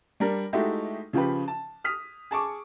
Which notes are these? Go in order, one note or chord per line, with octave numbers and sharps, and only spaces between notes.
G3 D4 A#4
G#3 A3 D#4 E4 F#4 G4
C#3 F3 F4 G4 B4
A5
D#6 F6 B6
G#4 A5 C#6 D6